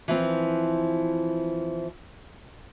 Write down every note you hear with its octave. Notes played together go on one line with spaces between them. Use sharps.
E3 F3 C4